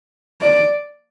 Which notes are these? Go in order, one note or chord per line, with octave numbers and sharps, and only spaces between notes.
D5